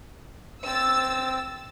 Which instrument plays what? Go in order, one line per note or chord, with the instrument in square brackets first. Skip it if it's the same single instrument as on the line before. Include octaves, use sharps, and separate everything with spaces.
[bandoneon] C4 [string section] E6 A6